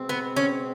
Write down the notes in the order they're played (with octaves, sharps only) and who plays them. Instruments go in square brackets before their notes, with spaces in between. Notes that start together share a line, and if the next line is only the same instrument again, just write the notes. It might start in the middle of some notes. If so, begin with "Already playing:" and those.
Already playing: [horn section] B2 G#3 C4
[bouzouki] B3
C#4